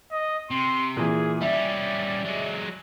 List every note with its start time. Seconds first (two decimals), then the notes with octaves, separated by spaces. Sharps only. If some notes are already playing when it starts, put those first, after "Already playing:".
0.11 D#5
0.51 C3 C6
0.97 A#2 E3 G#4
1.42 G3 C#4 D5 E5
2.25 F#3 G#3